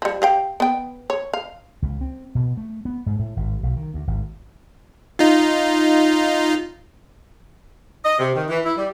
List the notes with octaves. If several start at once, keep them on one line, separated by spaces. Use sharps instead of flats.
F3 G3
G4 F5 G5
B3 G5
C#5
F5
C#2
C4
B2
A3
B3
G#2
A2
G#1
B1
D#3
D2
G#1
D#4 F4
D#5
C3
D#3
E3
E4
G3